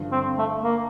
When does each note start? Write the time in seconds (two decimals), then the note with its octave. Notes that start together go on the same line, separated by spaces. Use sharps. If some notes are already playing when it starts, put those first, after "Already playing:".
Already playing: G2 D3 F3
0.12 C4
0.38 A3
0.64 A#3